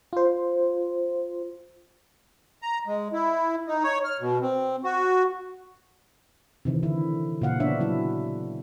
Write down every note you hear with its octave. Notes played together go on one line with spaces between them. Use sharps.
F4 C5
A#5
G#3
E4
D#4
C#5
F6
B2
C4
F#4
C3 D#3 E3
D3 E4
A#2 C#3 F5 F#5
B3 D4 C#5 E5
F#3 C#4 E4